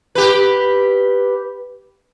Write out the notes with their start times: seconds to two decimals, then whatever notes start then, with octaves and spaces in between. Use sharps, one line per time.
0.15 G4 B4